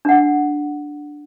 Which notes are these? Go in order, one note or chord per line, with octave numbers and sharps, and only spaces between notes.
D4 F#5